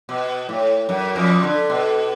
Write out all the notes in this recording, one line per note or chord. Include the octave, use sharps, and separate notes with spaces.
B2
A2
F#2
F2 F3
D3
B2